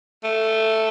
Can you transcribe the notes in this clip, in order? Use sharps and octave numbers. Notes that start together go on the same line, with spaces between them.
A3